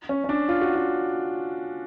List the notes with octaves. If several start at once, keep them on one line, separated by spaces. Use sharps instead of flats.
C#4
C#4
D4
F4
F#4
F4